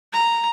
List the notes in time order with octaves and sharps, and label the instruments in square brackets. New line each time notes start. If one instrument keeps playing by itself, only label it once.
[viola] A#5